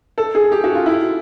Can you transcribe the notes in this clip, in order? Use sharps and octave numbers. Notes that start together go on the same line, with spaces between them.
A4
G#4
G4
F#4
F4
E4